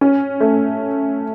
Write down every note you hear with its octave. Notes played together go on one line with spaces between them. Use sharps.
C#4
A3